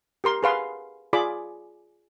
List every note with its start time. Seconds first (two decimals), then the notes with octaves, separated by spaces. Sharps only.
0.24 G4 A#4 C6
0.43 G#4 B4 F5 C6
1.13 F4 G#4 D5 B5 D6